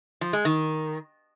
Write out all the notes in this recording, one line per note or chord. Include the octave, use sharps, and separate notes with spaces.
F3
G#3
D#3